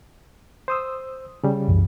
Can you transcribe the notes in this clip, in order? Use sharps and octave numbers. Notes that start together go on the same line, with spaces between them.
C5 D#6 E6
C#3 G3
C2 F#2 E3